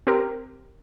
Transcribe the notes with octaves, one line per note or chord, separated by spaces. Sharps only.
C4 G4 A#4